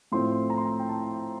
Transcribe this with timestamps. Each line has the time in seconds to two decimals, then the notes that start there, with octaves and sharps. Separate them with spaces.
0.12 A2 F3 A3 C4 C6
0.50 A#5
0.58 C6
0.65 A#5
0.79 G5
0.88 A5